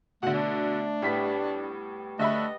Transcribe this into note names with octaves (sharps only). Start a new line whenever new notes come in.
B2 D3 A3 F#5
D4
A2 G3 B3 B6
D3 A3 D#5 E5 B5